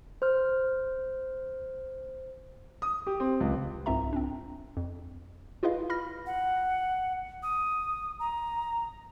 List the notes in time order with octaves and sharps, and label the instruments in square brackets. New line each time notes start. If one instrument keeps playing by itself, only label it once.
[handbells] C5 F6
[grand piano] D#6
G4
C4
C#2
[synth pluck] C2 G#2 C4 F4 E5 A#5
C4 D4
F2
E4 F4 G#4 B4 D#5 F5
B5 F6 A#6
[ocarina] F#5
D#6
A#5